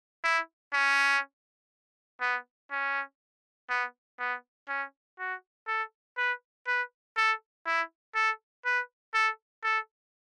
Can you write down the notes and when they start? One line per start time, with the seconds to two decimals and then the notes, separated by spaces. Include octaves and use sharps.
0.24 E4
0.74 C#4
2.21 B3
2.71 C#4
3.69 B3
4.19 B3
4.68 C#4
5.19 F#4
5.67 A4
6.17 B4
6.67 B4
7.17 A4
7.66 E4
8.15 A4
8.65 B4
9.14 A4
9.64 A4